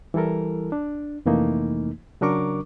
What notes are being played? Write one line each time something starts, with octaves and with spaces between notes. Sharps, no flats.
E3 G3 E4 A4 A#4
D4
F2 C3 E3 A3 A#3 D#4
C#3 F#3 D4 A#4 C#6 D6